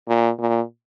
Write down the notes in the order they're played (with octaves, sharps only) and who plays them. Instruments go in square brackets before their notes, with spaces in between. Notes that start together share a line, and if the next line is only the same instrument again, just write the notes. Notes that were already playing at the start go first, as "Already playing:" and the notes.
[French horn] A#2
A#2